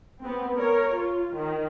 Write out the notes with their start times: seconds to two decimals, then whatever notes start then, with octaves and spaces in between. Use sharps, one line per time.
0.21 B3 C4
0.56 A#4 C#5
0.97 F4
1.35 D#3